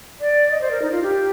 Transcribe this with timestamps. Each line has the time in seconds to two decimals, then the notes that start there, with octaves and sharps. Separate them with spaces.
0.20 D5
0.51 D#5
0.61 C5
0.71 A#4
0.82 D#4
0.92 F4
1.02 G4